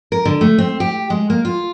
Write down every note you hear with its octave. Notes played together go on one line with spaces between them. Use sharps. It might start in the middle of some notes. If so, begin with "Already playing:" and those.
A#4
D3
A3
C4
G4
G#3
A#3
F4